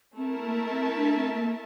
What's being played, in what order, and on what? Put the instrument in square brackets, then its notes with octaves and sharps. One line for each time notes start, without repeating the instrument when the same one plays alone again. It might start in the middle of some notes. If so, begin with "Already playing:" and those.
[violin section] A3 E4 A#4 E5 A5 [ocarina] C4
[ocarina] A#3
C4
D4
C4
A#3